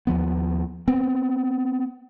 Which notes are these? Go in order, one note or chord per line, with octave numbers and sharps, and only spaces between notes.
D#2 F3 B3
B3 C4